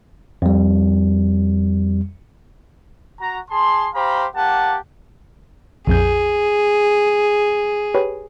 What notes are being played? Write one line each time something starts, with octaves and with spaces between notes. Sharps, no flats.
F2 G3
F#4 A#5
G#4 A5 C6
G4 C5 F5 A#5 B5
A#3 G4 F#5 A5
A#1 F2 G#4 G6
G4 B4 C#5